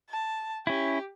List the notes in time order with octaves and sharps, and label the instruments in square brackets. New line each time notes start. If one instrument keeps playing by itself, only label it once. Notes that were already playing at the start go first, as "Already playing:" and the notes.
[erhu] A5
[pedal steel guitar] C#4 E4 [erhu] G4